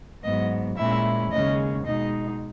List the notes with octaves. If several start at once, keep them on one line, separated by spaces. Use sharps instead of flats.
G#2 F#3 B3 D#5
A#2 G#3 C#4 E4 E5
D#2 C#3 G#3 C#4 D#5
B2 G#3 D#4 D#5